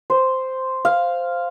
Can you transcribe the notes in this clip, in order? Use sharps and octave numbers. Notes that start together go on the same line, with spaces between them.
C5
F5